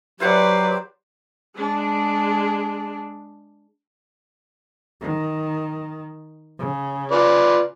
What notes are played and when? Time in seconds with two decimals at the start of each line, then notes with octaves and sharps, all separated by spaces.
0.20 F#3 E4 G4 B4 C5 D5 F#5
1.56 G#3 D4
5.02 D#3
6.59 C#3
7.11 F4 B4 D5